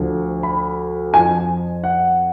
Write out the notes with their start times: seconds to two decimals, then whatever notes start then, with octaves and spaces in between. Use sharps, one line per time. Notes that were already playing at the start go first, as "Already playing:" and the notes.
Already playing: D2 D3 F3
0.43 B5
1.14 F2 F3 G#5
1.84 F#5